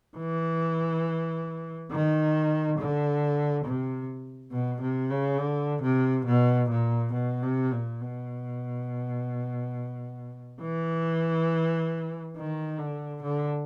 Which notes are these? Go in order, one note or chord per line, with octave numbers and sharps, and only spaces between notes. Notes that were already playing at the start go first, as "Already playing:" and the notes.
E3
D#3
D3
C3
B2
C3
C#3
D3
C3
B2
A#2
B2
C3
A#2
B2
E3
D#3
D3
D3